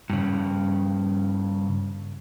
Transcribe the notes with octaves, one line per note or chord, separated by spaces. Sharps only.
G2 C#3